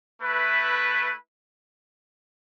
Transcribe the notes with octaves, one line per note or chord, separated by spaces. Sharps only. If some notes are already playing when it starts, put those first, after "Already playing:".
A3 E4 B4